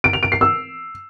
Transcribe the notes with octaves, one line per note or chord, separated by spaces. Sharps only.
D7
F7
D7
C7
E6